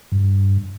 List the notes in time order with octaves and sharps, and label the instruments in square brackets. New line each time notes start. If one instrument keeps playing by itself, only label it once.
[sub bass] G2